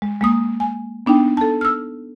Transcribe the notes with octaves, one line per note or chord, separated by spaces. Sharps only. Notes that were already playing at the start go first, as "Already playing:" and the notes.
G#3
G#3 A#3 D#6
G#5
B3 D4 D#4 G5
A4 A5
E6 F6